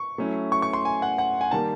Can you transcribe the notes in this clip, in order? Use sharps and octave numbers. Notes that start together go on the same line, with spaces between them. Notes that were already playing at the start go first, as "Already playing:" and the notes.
Already playing: C#6
F#3 A3 C#4 E4
C#6
C#6
C6
G#5
F#5
F#5
G#5
D#3 G3 A#3 A5